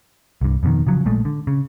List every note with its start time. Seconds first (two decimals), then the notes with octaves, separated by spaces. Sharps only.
0.41 C2 G2
0.63 F2 B2 D3 D#3
0.87 C#3 F3 F#3
1.05 A#1 A#2 G#3 A3
1.25 D3
1.47 C#3